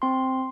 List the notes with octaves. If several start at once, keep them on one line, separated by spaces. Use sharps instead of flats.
C4 C6